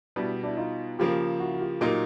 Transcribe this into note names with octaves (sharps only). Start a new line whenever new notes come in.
B2 G3 B3 D4 E4
D4 E4
D#4 F4
C#3 F3 A#3 F4 G4
E4 F#4
F#4
F4 G4
A#2 F#3 A#3 D#4 F4 G4